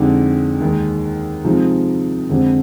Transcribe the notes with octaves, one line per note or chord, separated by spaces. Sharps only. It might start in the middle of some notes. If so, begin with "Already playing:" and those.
Already playing: F2 D3 G#3 D#4 G4
D#2 D#3 G#3
C3 F3 G#3 D#4
F2 D3 G#3 C4 G4